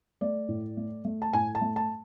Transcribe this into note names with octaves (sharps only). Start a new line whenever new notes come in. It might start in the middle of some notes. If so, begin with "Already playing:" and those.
A3 D5
A2
A3
A3
A5
A2 G#5
A5
A3
A5